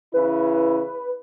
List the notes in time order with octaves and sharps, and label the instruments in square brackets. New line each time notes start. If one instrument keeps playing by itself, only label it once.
[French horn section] C#3 E3 E4 [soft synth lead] B4